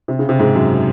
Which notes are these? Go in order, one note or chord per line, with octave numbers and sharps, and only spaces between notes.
C3
C#3
C3
G#2
F#2